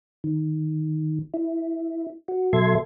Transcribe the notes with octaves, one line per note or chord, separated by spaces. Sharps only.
D#3
E4
F#4
B2 F#3 A4 E5 C6 G#6